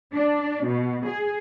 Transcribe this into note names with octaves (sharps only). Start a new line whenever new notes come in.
D4
B2
G#4